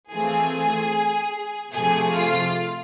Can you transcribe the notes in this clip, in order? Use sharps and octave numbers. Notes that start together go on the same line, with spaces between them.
E3 A3 C4 F4 G#4
C3 F3 A3 G#4
F4